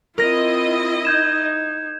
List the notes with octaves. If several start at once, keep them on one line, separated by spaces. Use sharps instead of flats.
C4 E4 F4 A#4 D#5 A#6
D#4 G6 G#6 E7